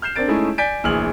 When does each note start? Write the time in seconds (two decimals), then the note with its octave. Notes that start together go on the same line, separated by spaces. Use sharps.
0.02 F6 G6 C7 E7
0.16 C4 D4 A#4 A6 D7
0.28 G#3 A3 C#4 D#4 E4 G#4
0.58 D5 G#5 G6 A6 B6 D7
0.84 D1 A#1 E3 G#4 F6 F#7